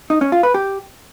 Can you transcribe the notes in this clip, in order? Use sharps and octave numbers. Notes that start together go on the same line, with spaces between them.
D#4
C#4
F4
B4
G4